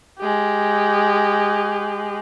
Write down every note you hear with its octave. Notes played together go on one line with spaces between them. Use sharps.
G#3 G4